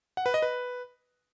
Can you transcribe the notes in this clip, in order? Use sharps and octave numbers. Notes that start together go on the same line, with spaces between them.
F#5
B4
D#5
B4